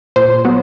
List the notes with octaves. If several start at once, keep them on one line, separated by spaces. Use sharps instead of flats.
A#2 C5
F#3 B3